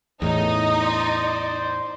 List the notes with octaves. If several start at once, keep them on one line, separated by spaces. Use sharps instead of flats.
E2 A2 D#4
C5 D5